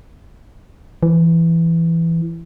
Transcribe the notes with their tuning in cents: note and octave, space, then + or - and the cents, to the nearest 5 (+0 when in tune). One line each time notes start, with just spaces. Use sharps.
E3 +10